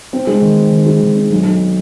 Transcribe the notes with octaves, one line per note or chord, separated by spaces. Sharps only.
C4
G#3
D#3
C4
D#3
G#3
D#3
C4
B1
B1